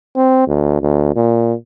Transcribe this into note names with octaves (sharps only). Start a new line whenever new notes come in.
C4
D2
D2
A#2